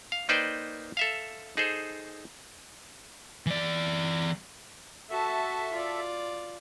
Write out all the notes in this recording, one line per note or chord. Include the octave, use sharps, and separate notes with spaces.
F5
A#3 D#4 B4 C5 D5 G5
A4 E5 F5
D#4 G#4 A4 C5
E3 D5
F#4 A4 E5 A5
F4 D5